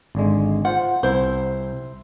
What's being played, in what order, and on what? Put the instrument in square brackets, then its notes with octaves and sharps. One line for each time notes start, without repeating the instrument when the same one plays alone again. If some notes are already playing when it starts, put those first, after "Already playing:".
[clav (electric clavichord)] G#1 D3 G#3
[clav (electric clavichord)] F4 C5 [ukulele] F#5
[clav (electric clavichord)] C2 [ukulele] E4 C5